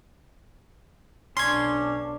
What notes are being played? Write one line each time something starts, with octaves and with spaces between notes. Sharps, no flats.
B1 C#4 D4 C6 G#6